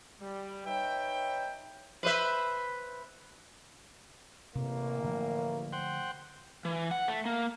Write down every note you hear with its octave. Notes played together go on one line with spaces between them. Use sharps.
G3
D#4 B4 C#5 E5 G5
B4 C5 E5
A1 C3 A#3
D3 F3 A3
C5 F#5 G5
E3
F#5
A3
A#3